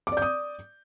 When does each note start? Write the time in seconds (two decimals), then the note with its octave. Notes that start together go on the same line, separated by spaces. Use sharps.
0.07 D6
0.12 D5
0.17 G6
0.22 D#6